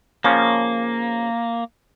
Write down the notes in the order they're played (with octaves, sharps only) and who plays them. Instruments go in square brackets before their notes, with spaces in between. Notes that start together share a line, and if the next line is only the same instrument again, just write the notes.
[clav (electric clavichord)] C#3 F3 C#4 [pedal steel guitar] A#3